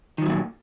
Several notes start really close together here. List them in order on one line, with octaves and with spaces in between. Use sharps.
D#3 F3 F#3 A#2